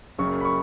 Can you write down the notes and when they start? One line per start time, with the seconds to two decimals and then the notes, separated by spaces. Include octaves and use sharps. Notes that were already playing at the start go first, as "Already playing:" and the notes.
0.18 F#1 F#2 C#3 C#6
0.40 B5
0.45 C#6